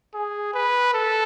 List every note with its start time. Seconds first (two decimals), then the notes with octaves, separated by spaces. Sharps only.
0.14 G#4
0.54 B4
0.93 A4